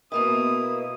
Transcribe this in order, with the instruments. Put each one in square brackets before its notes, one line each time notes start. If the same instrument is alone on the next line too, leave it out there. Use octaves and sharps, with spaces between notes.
[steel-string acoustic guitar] B2 A#3 E4 [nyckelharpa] D#6